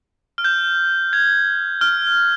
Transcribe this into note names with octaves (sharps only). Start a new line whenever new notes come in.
F6
G6
G#6
F6